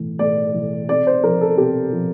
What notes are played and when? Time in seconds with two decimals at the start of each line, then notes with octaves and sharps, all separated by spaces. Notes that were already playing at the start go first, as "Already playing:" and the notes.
Already playing: A2 E3
0.19 A2 D5
0.54 E3
0.89 C3 D5
1.07 C5
1.24 F3 A#4
1.41 A4
1.57 C3 G4
1.92 F3